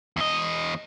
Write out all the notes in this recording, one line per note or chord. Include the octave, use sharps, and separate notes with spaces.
E2 D#5